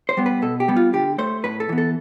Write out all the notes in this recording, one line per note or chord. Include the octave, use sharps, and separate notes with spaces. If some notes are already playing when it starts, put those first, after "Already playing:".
C5
G3 B3
B4
B2 A4
G4
G3 B3
F4
D3 G4
A3 C5
A2 B4
A4
E3 B3
A4